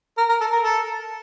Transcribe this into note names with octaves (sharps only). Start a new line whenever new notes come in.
A#4
A#4
A4
A#4
A4